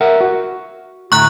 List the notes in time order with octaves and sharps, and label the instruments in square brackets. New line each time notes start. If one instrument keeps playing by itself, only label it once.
[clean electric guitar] A#4 E5 F#5
F#4
[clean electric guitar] D2 A2 A#5 [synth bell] C#6 F#6